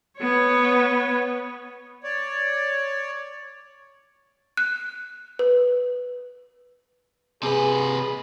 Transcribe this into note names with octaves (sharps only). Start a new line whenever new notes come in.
B3 C#5
C#5 D5
F#6
B4
C3 G#4 B4